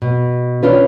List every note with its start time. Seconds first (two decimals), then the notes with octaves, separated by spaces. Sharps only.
0.02 B2
0.63 C#4 D4 F4 B4